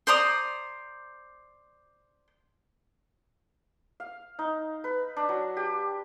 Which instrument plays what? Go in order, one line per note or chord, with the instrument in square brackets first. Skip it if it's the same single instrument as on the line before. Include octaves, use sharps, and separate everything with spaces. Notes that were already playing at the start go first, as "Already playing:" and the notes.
[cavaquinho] C5 D5 A#5 D#6
[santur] F5
D#4
B4
D4
F#3
G4